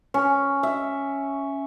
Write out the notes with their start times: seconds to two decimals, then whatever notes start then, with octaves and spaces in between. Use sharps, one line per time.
0.14 C#4
0.63 E5